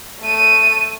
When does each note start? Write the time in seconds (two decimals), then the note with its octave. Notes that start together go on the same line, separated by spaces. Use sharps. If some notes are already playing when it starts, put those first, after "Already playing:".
0.21 A3 D#7